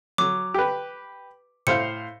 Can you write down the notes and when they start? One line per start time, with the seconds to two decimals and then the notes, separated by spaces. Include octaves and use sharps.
0.18 F#3 D6
0.54 G4 B4
1.67 A2 C5 F5 C#7